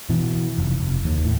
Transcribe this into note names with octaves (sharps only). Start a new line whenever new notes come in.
B2 E3
F1
F1
D#2
A2